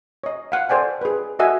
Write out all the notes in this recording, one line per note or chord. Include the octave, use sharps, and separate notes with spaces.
C#5 D#5
F5 F#5
A4 C5 D5 G5 G#5
G#4 B4
F#4 A4 D#5 E5 F#5 G#5